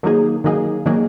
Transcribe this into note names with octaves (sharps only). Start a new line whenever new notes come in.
D#3 F#3 A#3 D#4 G#4
D#3 F#3 A#3 D#4 G#4
D#3 F#3 A#3 D#4 G#4